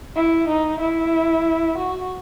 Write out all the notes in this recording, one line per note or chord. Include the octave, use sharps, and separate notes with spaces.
E4
D#4
E4
F#4